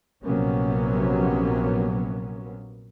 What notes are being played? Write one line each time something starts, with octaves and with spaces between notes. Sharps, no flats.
A#1 C3 F#3 A#3 B3 C#4